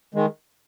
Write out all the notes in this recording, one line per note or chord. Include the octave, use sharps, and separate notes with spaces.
D#3 G#3